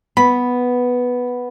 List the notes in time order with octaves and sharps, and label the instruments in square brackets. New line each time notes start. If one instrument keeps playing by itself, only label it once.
[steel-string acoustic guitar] B3 [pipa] B5